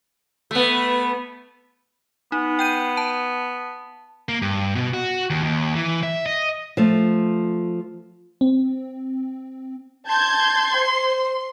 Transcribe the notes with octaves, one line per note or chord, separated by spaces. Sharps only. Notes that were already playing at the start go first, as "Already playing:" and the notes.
A3 B3
B3 D#4
G5 G6 D#7
A5
A#3
G2
B2
F#4
D#2
D#2
E3
E5
D#5
F3 A3
C4
A5 C6 G6 G#6
C5